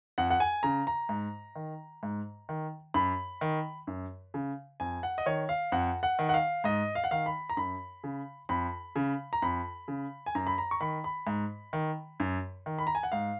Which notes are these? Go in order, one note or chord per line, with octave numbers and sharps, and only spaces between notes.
F2 F#5
F#5
G#5
C#3 A#5
A#5
G#2
D#3
G#2
D#3
F#2 B5
D#3
F#2
C#3
F2 G#5
F#5
D#5
D#3 C#5
F5
F2 F#5
F#5
D#3
F#5
F5
G#2 D#5
F5
F#5
D#3 F5
B5
A#5
F#2 B5
C#3
F2 B5
C#3
A#5
F2 B5
C#3
G#5
F#2 A#5
B5
A#5
C#6
D#3 B5
B5
G#2
D#3
F#2
D#3
B5
A#5
G#5
F#5
G#2 F5